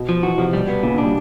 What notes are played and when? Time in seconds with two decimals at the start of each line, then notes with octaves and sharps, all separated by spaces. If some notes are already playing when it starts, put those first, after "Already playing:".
Already playing: B2
0.09 F3
0.23 E3 F#4
0.38 C3 F3
0.53 B2 G3
0.68 B3
0.83 A#2 C#3
0.93 D3
0.98 D4
1.03 G3